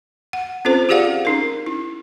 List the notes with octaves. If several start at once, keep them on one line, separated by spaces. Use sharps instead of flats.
F#5
C4 C#4 F4 A4 C5
F4 G4 G#4 D5 F5 F#5
C#4 D#4 A#4
E4